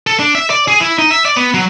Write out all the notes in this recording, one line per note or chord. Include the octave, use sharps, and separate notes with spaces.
A4
D4
E5
D5
G#4
E4
D#4
E5
D5
B3
F#3